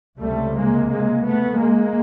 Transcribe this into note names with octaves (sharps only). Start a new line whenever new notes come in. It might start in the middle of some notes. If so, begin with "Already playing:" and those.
C#2 C3 G3 A3
G#3 A#3
G#3 A#3
A3 B3
G#3 A#3